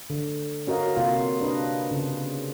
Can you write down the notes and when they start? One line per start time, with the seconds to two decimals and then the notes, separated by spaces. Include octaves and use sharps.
0.10 D3
0.67 C#4 F#4 A#4 D#5 F5
0.96 C3 A#3 F4
1.41 D4 B4 D#5
1.91 C#3